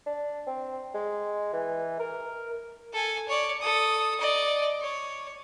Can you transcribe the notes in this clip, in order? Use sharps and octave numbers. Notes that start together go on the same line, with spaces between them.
D4
C4
G#3
E3
A#4
A4 G#5
C#5 D5
A4 D#6
D5 D#5
C#5